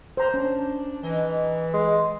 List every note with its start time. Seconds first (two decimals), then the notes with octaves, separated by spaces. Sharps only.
0.17 C5 A#5
0.34 C#4 D4
1.03 G#2 E3 D#5
1.73 G#3